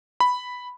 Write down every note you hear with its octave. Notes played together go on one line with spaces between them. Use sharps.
B5